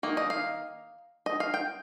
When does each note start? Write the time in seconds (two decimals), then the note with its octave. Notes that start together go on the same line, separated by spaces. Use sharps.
0.03 D#3 A#3
0.17 D#5
0.30 F5
1.26 D#5
1.40 F5
1.54 G5